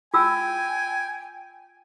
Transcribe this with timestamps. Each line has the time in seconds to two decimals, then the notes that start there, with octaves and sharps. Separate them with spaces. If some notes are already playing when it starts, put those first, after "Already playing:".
0.14 F4 G5 G#5 E6